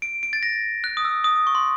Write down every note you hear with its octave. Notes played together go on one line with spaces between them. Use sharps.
D7
D7
A6
A#6
F#6
D#6
E6
D#6
C#6
C6